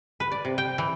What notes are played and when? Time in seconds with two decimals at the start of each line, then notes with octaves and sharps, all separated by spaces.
0.20 B4
0.32 D5
0.45 C3
0.58 G5
0.78 E3